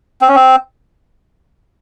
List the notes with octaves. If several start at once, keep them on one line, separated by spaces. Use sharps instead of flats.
C4
C#4
C4